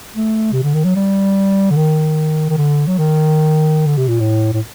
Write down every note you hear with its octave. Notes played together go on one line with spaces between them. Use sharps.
A3
C3
D3
D#3
F#3
G3
D3
D#3
D#3
D3
F#3
D#3
D3
C3
A#2
A2
A2